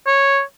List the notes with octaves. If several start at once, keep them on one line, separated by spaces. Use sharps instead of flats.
C#5